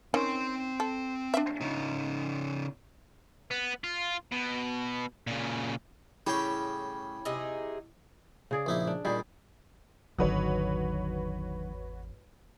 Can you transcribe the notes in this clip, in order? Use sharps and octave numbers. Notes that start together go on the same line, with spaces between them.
D#3 C4 C#4 C6
A4
D4 E5
C#3 D#4
B3
F4
B2
A#2 C#3
A2 C#3 G3 C#4 E4 G5
C3 D#4 G#4
C#3 G#4 D5
A#1 D#4 E4
D4
A#2 D#3 G3 G#4
G#1 E2 D3 D#3 F#3 F#4 B4 C#5